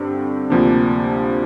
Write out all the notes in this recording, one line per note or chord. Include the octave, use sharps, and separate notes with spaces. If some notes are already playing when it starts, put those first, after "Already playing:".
Already playing: G2 D3 G3 C4 G4
D2 C3 F3 A#3 D4